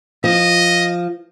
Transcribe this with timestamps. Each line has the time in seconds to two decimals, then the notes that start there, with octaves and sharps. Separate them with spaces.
0.24 F3 D#5